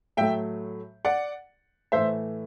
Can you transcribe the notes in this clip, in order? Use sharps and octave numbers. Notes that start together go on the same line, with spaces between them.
A2 F#3 A3 E5 G5
D5 F#5
A2 E3 A3 C5 E5